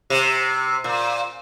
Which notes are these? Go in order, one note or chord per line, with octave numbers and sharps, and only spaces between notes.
C3
A#2